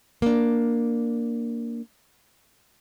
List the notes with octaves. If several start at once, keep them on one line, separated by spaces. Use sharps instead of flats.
A#3 D4